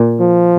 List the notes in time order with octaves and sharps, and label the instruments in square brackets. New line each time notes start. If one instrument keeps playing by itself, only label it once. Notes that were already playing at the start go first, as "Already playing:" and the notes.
Already playing: [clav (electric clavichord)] A#2
[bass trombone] F3